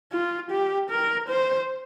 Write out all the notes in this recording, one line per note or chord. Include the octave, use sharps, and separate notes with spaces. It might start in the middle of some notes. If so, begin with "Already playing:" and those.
F4
G4
A#4
C5